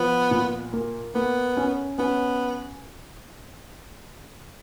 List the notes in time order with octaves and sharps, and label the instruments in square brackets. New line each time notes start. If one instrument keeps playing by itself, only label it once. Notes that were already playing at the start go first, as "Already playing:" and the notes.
Already playing: [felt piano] F3 [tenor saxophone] B3
[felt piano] A#2
A#3
[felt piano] A#3 [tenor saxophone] B3
[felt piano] C#4
[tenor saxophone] B3 [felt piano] C#4